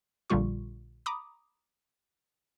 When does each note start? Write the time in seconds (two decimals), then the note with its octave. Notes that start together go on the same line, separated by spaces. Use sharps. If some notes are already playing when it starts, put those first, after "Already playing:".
0.30 A#1 A#2 D3 G3 F4 C#6
1.06 A#5 B5 D6 D#6